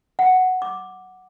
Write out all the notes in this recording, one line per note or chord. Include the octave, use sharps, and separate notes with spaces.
F#5
D6